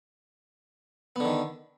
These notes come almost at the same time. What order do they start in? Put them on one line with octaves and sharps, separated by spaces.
B3 D3 D#3